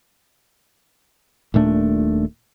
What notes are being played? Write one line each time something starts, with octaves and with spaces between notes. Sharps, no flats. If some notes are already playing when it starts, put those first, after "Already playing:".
D#1 A#2 A3 D4